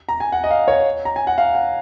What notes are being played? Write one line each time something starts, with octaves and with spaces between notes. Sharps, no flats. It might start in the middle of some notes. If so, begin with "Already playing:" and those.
A#5
G#5
F#5
D#5
F5
C#5
A#5
G#5
F#5
F5
F#5